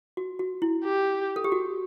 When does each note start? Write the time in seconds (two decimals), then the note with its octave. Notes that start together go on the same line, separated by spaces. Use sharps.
0.17 F#4
0.39 F#4
0.62 E4
0.84 G4
1.36 A4
1.44 G4
1.52 F#4